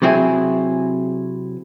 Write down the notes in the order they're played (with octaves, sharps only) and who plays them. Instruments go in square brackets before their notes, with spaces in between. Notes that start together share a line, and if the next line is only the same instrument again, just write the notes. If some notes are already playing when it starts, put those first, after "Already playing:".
[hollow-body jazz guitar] C3 F#3 C4 E4 G#4